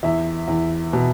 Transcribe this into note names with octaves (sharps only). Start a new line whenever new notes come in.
E2 E4 E5
E2
B2